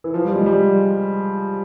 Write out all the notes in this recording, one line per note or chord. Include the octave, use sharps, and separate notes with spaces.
E3
F3
G3
G#3
G3